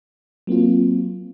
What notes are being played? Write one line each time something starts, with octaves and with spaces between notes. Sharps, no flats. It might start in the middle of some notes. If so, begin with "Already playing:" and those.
F#3 A#3 C4 F4